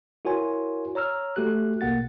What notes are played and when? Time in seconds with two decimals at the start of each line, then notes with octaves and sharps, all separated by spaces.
0.25 E4 F#4 A#4 C#5 G#5 C6
0.95 C#5 A#5 E6 F6
1.36 A3 F#4 G4 A4 F#6
1.81 A#1 B2 A#3 F#5 A6